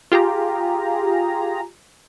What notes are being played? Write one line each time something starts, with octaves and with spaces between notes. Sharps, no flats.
F4 G4 G#4 A#5